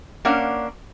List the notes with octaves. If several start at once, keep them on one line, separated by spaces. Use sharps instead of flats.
A#3 C#4 D4 F5 F#5